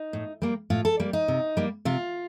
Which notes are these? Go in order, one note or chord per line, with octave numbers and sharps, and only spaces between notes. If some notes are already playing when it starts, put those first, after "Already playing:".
Already playing: D#4
A2
G3 A#3
A2 F4
A4
G3 A#3
D#4
C3
G3 A#3
C3 F4